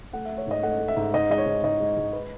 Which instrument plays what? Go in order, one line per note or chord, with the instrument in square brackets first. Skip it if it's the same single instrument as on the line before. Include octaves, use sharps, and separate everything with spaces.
[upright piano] A3 F#5
A3 E5
C#5
G#2 D#5
A3 F#5
A3
E5
G#2
G#2 D#5
G#3 D#5
C#5
G#2
G#2 D#5
G#3
G#3
B4